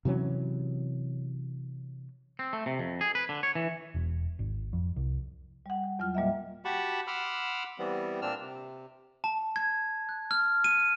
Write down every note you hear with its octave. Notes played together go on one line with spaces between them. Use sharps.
C3 E3 F#3 C#4
C4
A3
C3
F2
G#4
B4
D3
C#5
E3
E1
G#1
F2
C2
G3 F#5
F#5
E2 F#3 F4 F6
A#2 G3 A#3 D#5 E5
F#4 G4 F#5 A5 B5 C#6
F#5 B5 C6 D6 E6 F6
E3 G3 B3 C4
A#2 C4 D4 E6 F6
C3
A5
G#6
F#6
F6
D#7